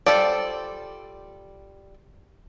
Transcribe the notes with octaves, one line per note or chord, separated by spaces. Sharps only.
G3 F4 A4 C5 D5